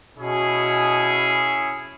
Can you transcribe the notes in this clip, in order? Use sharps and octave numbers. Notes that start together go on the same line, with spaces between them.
B2 C#4 E4 G#4